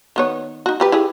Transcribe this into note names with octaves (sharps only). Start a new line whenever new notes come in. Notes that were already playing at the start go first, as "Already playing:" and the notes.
D#3 B3 C#5
D#4 F#4
F3 G4 B4
E4 G4 G#4